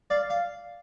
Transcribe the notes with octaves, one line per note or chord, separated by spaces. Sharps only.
D5 F5
F5